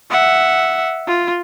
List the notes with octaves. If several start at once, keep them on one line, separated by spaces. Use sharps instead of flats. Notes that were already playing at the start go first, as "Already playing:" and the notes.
E5 F#5
F4